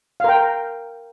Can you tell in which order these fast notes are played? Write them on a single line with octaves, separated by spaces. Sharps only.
F5 A#4 G5